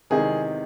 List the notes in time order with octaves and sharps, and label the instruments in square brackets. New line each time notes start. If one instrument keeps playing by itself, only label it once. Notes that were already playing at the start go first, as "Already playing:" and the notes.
[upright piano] E2 C3 D#3 G#3 G#4